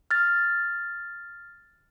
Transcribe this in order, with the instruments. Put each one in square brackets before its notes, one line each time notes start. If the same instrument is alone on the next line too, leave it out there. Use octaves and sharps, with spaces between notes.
[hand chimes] F6 A6